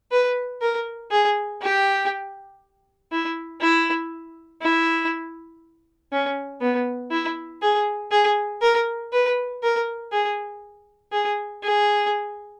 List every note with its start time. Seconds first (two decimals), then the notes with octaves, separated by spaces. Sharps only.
0.12 B4
0.61 A#4
1.12 G#4
1.62 G4
3.12 E4
3.61 E4
4.62 E4
6.12 C#4
6.61 B3
7.11 E4
7.62 G#4
8.11 G#4
8.62 A#4
9.13 B4
9.63 A#4
10.12 G#4
11.12 G#4
11.63 G#4